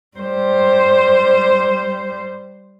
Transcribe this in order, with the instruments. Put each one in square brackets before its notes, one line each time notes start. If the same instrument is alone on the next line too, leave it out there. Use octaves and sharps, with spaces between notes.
[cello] G3 C5